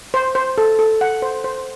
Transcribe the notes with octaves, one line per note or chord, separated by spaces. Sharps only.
C5
C5
A4
A4
F#5
C5
C5